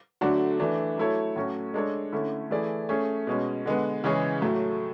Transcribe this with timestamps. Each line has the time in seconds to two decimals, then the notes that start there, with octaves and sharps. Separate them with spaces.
0.21 D3 F#3 A3 D4 F#4
0.60 E3 A3 D4
0.97 F#3 A3 E4 A4 C#5
1.36 A2 F#3 A3 C#4 F#4
1.74 G#3 D4 A4 C#5
2.12 D3 A3 C#4 E4
2.50 E3 A3 E4 G#4 D5
2.89 A3 C#4 G#4
3.27 B2 G#3 C#4
3.65 D3 G#3 B3
4.04 C#3 E3 G#3 C#4 G#4
4.42 A2 F#3 A3